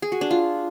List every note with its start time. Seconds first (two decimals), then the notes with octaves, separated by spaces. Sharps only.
0.02 G#4
0.12 F#4
0.21 D4
0.31 F4